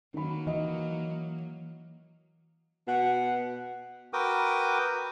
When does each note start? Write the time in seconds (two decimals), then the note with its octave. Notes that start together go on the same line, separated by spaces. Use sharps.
0.14 D#3 F#3 A#3 B5
0.47 E3 D#5
2.88 B2 F#5
4.13 F#4 A#4 B4 G5 D6 D#6